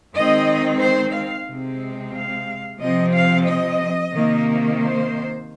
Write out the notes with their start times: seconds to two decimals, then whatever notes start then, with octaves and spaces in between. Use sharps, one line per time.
0.14 D#3 G#3 C4 D#5
0.80 C5
1.13 F5
1.47 C3 G#3 C4
2.13 F5
2.79 C3 F3 C4 D#5
3.13 F5
3.45 D#5
4.13 C3 D#3 A#3
4.79 C5